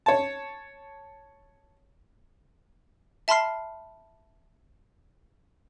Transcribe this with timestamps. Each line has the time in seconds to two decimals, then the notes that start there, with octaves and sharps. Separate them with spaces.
0.06 C#5 A5
3.28 E5 A5 B5 C6 F6 C7